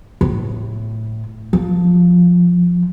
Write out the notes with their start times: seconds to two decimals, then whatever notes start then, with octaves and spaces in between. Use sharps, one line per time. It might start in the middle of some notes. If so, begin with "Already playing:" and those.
0.21 A2
1.53 F3